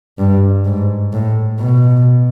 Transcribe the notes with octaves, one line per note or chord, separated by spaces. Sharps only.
G2
G#2
A2
B2